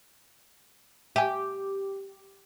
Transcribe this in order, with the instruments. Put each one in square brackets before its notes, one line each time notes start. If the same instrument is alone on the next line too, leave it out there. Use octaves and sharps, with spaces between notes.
[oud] G4 [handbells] E5 G#5